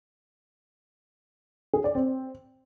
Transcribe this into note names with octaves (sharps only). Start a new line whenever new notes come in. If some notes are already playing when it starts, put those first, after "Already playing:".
G#4
D5
C4